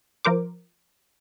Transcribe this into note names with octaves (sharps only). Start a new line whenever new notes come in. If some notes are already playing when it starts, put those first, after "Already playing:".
F3 A#4 C5 D6